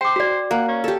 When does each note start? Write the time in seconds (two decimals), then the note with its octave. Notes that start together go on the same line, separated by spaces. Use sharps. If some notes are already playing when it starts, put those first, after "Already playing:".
0.01 C5 G5 D6
0.16 F#4 D5
0.51 A#3 F#5
0.68 C#4
0.84 G4 A4